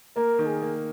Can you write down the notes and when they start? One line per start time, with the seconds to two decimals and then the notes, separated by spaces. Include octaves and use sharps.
0.16 A#3 A#4
0.39 D#3
0.46 G#4
0.62 A#3